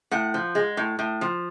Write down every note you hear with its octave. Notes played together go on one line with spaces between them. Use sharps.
A2 F#5
F3
G#3
A2
A2
F3